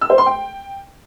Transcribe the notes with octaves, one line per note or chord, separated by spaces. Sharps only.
E6
C5
C6
G5